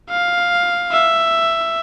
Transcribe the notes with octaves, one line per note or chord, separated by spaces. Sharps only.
F5
E5